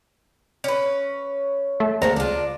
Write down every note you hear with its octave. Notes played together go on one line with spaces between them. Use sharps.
C#4 B4
A3
D#2 G#3 C4 A4 F5 A#5
C#2 D4 F4